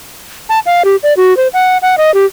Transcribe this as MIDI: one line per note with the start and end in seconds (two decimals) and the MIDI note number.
0.49 0.59 81
0.66 0.83 77
0.85 0.96 67
1.03 1.14 74
1.17 1.36 66
1.37 1.48 72
1.54 1.78 78
1.82 1.96 78
1.98 2.13 75
2.14 2.25 67